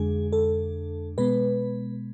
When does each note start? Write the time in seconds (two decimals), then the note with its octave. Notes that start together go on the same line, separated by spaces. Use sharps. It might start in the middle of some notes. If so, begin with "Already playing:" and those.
Already playing: F2 D3 G#3 D4 G#4
0.33 A4
1.18 B2 G#3 B3 B4